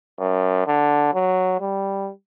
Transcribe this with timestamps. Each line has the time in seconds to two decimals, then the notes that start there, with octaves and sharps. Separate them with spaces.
0.19 F#2
0.67 D3
1.14 F#3
1.61 G3